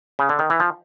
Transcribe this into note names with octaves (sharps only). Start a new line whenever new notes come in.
C#3
D3
D#3
E3
F3